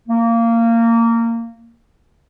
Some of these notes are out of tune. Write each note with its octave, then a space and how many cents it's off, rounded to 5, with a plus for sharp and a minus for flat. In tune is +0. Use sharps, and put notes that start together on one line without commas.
A#3 -20